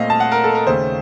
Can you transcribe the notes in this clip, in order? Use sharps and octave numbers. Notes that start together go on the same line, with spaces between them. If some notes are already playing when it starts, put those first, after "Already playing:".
Already playing: A#2 A3 C4 D#5 F5
A5
F#5
A#4
A4
A#4
D#2 C#3 A3 C5